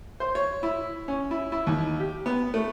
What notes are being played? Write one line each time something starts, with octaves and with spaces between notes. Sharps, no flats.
C5
C#5
E4
C#4
E4
E4
D#2
G4
B3
A3